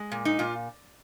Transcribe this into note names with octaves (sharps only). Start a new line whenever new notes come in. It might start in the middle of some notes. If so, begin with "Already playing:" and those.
Already playing: G#3
A#2
D#4
A#2 F4